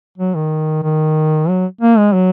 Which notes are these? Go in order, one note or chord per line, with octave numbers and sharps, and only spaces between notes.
F#3
D#3
D#3
F#3
A#3
G#3
F#3